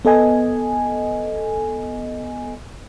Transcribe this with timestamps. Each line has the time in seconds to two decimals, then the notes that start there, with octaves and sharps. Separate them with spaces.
0.05 B3 A4 D#5 G#5